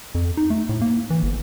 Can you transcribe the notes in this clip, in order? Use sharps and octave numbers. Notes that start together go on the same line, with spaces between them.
F2
D#4
A3
A2
A#3
E3
G1